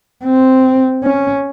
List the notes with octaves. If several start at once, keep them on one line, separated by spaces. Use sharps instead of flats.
C4
C#4